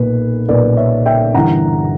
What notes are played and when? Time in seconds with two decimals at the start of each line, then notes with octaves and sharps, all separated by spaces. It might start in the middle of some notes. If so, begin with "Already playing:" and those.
Already playing: B1 A#2 A#3 B4
0.49 B1 A#2 A#3 B4 D5
0.77 C#5 E5
1.06 E5 G5
1.34 G1 G2 E3 F#5 A#5